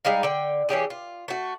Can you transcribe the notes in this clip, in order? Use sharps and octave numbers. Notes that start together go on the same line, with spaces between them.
G3 G#3 D#4 F5
D3 G5
E3 C#4 G4 G#4
F4
A3 F#4